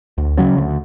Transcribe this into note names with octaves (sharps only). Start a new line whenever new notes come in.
D2
C#3 F#3 C#4
D2